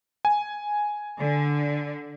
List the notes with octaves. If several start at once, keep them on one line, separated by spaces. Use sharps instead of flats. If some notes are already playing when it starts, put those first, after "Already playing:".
G#5
D3